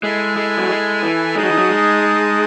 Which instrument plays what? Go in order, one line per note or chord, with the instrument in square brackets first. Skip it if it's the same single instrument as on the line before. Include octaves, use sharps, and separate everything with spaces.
[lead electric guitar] G#3 [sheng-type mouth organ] E4 A4 E5 G#5
[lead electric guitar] G#3
F#3
G#3
E3
[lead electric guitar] G#3 [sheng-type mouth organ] D#4 G#4 D#5 A5
[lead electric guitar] F#3
E3
F#3
G#3